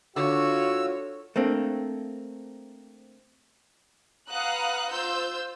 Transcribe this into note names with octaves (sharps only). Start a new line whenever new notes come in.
D3 F4 F#4 C#5 E6
A3 A#3 C4 D4
B4 F5 F#5 A#5 D#6 F#6
F4 C5 E6 G6